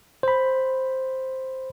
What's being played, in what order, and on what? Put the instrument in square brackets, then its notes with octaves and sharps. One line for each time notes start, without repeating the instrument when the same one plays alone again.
[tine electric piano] C5 B5